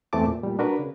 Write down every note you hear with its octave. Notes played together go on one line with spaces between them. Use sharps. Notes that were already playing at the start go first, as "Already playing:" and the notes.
E2 E3 A3 C4 A5 D6
A#2
A#2 G3
D4 F#4 A#4 B4
C#3